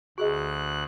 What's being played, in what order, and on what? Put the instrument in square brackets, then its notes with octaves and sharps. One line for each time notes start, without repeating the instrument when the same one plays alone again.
[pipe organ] D2 F#6 [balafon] F#4 G#4 D#5